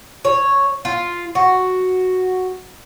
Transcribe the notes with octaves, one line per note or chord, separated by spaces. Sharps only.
C#5
F4
F#4